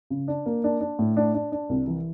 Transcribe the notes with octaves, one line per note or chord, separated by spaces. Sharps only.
C#3
D4
A#3
D4
D4
A2
D4
D4
D4
C2
E3